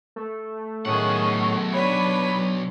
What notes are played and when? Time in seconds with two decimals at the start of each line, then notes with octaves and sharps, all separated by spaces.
0.16 A3
0.85 B1 A2 D#3 C#4 G#4 F#5
1.73 D4 B4 C#5 B5